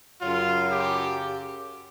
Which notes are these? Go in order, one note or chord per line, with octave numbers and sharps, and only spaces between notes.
F#2 C#3 F#3 F4
G4